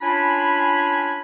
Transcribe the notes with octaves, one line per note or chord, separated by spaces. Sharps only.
C#4 D4 F4 G#5 B5